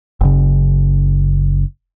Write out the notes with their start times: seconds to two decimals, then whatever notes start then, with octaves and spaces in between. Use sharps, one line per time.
0.21 F#1 C#3